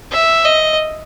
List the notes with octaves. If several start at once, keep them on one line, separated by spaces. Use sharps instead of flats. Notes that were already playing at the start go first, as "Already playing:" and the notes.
E5
D#5